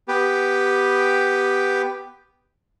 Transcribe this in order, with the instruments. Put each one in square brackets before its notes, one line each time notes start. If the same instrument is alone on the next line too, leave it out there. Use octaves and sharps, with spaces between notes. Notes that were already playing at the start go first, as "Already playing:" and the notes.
[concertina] B3 G4